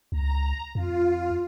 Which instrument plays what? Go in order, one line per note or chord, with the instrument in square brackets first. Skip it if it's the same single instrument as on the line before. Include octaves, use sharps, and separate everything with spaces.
[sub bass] C#2 [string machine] A#5
[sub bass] F2 [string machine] F4